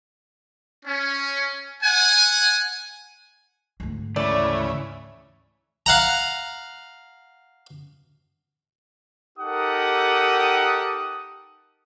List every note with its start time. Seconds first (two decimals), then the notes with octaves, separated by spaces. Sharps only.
0.85 C#4
1.82 F#5 G#5
3.80 D2 G#2
4.16 C#3 E3 A3 D5
5.86 F5 F#5 A#5
9.39 D#4 G4 A4 A#4 F#5 D#6